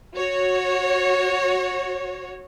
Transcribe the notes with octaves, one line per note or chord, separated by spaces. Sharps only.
F#4 C#5